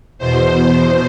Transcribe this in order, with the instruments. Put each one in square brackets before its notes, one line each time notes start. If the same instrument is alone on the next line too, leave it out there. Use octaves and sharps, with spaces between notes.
[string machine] E2 B2 C5